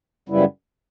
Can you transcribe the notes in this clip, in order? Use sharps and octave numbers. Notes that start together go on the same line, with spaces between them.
F#2 C#3 G3 B3 E4